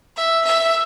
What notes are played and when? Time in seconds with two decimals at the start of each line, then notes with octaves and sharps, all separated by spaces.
0.17 E5
0.45 E5